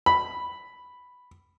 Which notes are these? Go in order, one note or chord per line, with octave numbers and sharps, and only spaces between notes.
B5